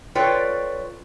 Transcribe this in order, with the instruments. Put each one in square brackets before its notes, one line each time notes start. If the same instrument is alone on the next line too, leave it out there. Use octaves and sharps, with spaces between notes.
[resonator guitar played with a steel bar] F4 A4 B4 C#5 D5 G5